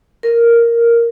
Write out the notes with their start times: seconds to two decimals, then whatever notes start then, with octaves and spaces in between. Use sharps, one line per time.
0.23 A#4